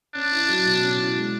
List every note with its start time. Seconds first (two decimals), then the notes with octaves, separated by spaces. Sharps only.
0.15 C#4 D4
0.32 E4
0.49 F#3
0.65 B2
0.83 C#4
1.00 E4
1.16 G#3